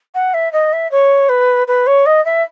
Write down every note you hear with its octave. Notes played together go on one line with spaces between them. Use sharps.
F#5
E5
D#5
E5
C#5
B4
B4
C#5
D#5
E5